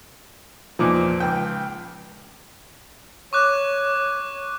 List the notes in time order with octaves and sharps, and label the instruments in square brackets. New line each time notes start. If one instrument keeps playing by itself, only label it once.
[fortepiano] E2 A#2 D#4 [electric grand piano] F3
[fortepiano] C#2 G5
[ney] C#5 [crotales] C#6 D6 F#6